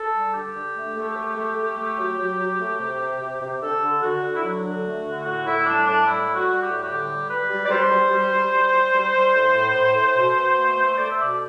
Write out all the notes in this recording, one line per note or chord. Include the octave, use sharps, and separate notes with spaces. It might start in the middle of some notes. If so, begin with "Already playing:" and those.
Already playing: A4
G3
D3 G4
D3
A3
A3
A3
A3
A3
A3
F#3
F#3
F#3
A3
C3
C3
C3
C3
D3 A4
D3
D3 F#4
D3
E4
F#3 F#4
D3
A3
D3
A2 F#4
A2 E4
G3 D4
A2 D4
G3 E4
G3
F#4
G3
G4
A2
F#4
D3 G4
G3
G3 B4
G3
D5
G3 C5
G3
G3
G3
G3
G3
G3
G3
A2
A2
A2
A2
B2
B2
A3
A3
A3 D5
E5
B2 D5